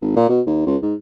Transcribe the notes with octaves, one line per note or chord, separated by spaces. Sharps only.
G#1
A#2
B2
D#2
C#2
G#2